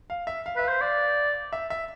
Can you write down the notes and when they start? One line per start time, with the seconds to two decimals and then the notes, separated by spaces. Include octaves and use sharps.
0.10 F5
0.27 E5
0.46 F5
0.56 B4 E5
0.63 F5
0.68 C5
0.81 D5 F5
1.53 E5
1.70 E5